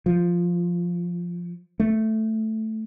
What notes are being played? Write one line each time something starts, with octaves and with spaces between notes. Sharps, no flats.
F3
A3